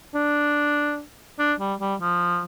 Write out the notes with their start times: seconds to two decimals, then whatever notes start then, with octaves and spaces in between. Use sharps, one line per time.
0.14 D4
1.39 D4
1.60 G3
1.80 G3
2.01 F3